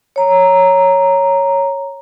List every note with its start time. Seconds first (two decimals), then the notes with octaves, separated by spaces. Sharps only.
0.16 C#5 A#5